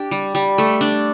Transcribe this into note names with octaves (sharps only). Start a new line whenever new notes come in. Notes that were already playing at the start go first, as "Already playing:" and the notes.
Already playing: D4 G4
G3
G3
A3
D4